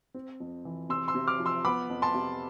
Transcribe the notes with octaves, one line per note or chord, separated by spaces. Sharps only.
C4
F2
E3
C3 C6 E6
C6 E6
C3
D6 F6
F3
C6 E6
B3 B5 D6
F2
A5 C6
C3